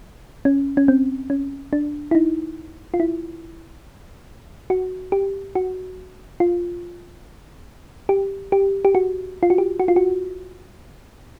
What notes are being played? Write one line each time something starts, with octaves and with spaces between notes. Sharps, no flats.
C#4
C#4
C4
C#4
D4
E4
D#4
F4
E4
F#4
G4
F#4
F4
G4
G4
G4
F#4
F4
F#4
G4
F#4
F4
F#4